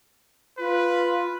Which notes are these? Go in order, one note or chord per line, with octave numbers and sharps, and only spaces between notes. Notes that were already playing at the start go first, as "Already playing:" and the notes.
F4 B4